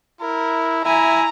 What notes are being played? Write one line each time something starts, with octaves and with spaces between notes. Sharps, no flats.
E4 A#4
E4 E5 G#5 A#5